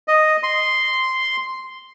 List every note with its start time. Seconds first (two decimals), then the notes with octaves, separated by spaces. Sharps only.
0.08 D#5
0.43 C6